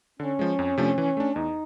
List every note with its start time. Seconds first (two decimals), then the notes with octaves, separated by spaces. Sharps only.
0.19 D3 C#4
0.39 F3 G#3
0.59 F2
0.78 C3 F3 A3 D4
0.98 E3
1.17 A3 D4
1.36 E2 D#4